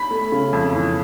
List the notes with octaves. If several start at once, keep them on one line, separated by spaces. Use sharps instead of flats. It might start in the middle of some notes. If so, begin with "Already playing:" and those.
Already playing: B5 B6
A3
C#3
F2
E3